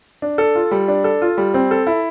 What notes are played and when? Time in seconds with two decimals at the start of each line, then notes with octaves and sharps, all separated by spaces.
0.22 D4
0.38 A4
0.55 F4
0.71 G3
0.88 D4
1.04 A4
1.22 F4
1.38 G3
1.54 C4
1.71 A4
1.87 E4